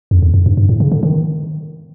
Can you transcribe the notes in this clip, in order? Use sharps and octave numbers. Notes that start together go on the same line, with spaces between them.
F2
E2
F2
G2
G2
A2
C#3
D3
D#3